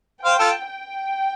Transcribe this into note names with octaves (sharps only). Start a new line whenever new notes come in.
C5 F5 G5
F4 A4
G5